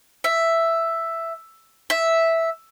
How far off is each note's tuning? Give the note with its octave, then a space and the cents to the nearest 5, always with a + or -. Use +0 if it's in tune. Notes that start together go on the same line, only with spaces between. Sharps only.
E5 +5
E5 -5